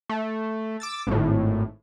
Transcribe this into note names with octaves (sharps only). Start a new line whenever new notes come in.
A3
D6 E6 A6
G#1 A2